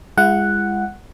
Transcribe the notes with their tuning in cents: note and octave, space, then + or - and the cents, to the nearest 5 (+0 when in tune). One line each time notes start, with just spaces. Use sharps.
G#3 -30 E4 +40 F#5 +0